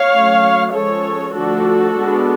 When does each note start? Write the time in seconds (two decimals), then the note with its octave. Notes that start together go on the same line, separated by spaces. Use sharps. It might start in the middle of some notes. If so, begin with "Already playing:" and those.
Already playing: C#5 F5
0.12 F#3 A3 C#4
0.73 F3 G#3 C#4 A4 C#5
1.35 D3 F3 A3 D4 F#4 A4
1.98 G#3 B3 D4